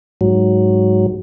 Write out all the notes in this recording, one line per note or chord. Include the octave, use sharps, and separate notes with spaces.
G#2 F#3